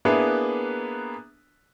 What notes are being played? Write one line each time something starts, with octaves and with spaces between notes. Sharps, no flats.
A#3 B3 D4 E4 G#4 B4